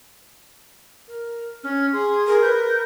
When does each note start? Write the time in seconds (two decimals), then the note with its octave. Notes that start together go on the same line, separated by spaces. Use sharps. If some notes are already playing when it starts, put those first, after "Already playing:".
1.07 A#4
1.63 C#4 F6
1.93 G#4 C6
2.27 G#4 A#4
2.42 B4 G6